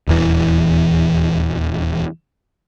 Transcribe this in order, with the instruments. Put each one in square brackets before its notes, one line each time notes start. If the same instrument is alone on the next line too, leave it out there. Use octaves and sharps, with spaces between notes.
[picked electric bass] D#1 E2 E3